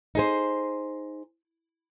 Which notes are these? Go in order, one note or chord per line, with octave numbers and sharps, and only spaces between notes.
D#4 G#4 C5